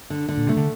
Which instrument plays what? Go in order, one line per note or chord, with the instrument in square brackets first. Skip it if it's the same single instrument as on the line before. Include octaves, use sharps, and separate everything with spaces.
[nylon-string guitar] D3
D3
[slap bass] A#2
[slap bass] C3 [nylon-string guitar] A3
[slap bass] D3